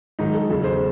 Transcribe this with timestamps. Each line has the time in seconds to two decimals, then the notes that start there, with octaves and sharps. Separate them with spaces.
0.19 G#2 D#3 F#3 D#4
0.34 A4
0.49 E2 C#3 F#3 A4
0.64 C5